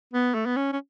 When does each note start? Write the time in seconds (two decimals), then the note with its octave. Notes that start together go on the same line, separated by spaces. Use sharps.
0.13 B3
0.34 A3
0.46 B3
0.56 C#4
0.73 C#4